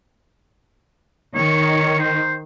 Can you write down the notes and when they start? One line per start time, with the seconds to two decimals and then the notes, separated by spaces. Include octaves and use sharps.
1.35 D#3 C#5
1.99 C5